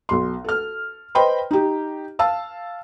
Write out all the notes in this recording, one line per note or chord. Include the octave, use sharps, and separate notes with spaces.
B1 C6
A4 F6
B4 C5 D#5 G5 B5 C6
D#4 G4
F5 A5 E6